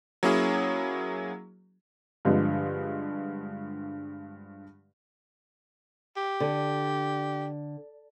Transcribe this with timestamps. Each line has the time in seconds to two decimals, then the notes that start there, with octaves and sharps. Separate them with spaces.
0.23 F#3 A#3 C#4 E4 G#4
2.25 G2 D3 F3 G#3
6.17 G4
6.40 D3